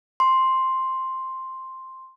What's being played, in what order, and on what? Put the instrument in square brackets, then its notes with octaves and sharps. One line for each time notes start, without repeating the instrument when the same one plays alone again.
[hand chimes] C6